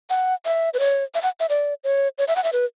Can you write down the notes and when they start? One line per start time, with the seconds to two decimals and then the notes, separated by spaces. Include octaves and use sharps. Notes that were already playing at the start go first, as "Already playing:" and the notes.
0.10 F#5
0.45 E5
0.74 B4
0.79 C#5
1.14 E5
1.22 F#5
1.40 E5
1.49 D5
1.84 C#5
2.18 C#5
2.28 E5
2.36 F#5
2.44 E5
2.53 B4